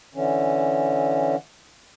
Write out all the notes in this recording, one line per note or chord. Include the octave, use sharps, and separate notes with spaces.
D3 E3 C#4